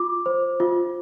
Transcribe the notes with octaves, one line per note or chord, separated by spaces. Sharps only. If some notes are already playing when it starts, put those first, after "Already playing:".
Already playing: F4 D6
C5
F4